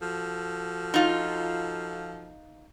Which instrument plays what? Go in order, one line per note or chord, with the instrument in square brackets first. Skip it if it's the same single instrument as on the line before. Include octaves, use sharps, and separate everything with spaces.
[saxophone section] F3 F#4 A4
[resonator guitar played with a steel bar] D#4 F4